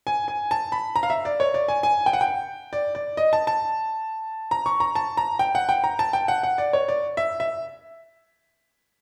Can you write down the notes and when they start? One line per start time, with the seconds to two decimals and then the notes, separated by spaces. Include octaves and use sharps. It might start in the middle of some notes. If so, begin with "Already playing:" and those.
0.07 G#5
0.28 G#5
0.51 A5
0.72 B5
0.96 A#5
1.03 F5
1.10 E5
1.25 D5
1.40 C#5
1.54 D5
1.68 G#5
1.83 G#5
2.06 G5
2.13 F#5
2.21 G5
2.73 D5
2.95 D5
3.17 D#5
3.33 A5
3.47 A5
4.51 A#5
4.66 C#6
4.80 A#5
4.95 A5
5.17 A#5
5.39 G5
5.55 F#5
5.69 G5
5.84 A#5
5.99 A5
6.13 G5
6.28 F#5
6.43 F#5
6.58 D5
6.73 C#5
6.88 D5
7.17 E5
7.40 E5